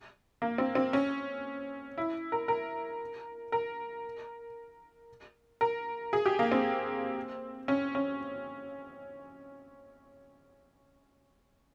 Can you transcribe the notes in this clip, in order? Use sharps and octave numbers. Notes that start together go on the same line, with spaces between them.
A#3
C4
C4
C#4
E4
A#4
A#4
A#4
A#4
G#4
G4
A#3
C4
C#4
C#4